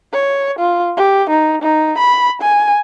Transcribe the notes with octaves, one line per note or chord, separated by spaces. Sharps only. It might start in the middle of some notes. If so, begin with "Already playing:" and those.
C#5
F4
G4
D#4
D#4
B5
G#5